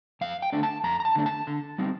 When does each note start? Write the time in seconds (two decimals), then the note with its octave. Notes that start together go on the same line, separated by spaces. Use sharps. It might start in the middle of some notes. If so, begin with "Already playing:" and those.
0.21 F2 F5
0.42 G5
0.53 D3 A3 D4
0.63 A5
0.84 F2 A#5
1.00 A#5
1.05 A5
1.15 D3 A3 D4
1.26 A5
1.47 D3
1.78 G3 C4 D#4